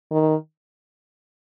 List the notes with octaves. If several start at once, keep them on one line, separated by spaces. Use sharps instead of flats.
D#3